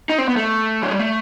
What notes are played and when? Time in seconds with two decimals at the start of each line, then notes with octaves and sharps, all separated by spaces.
0.09 D#4
0.18 C4
0.28 B3
0.37 A3
0.83 F#3
0.91 G3
0.99 A3